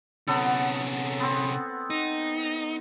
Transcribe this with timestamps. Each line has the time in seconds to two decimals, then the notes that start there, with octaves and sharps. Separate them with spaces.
0.28 C3 F#3 B3 C#4 A4
1.20 B3 C4
1.90 D#4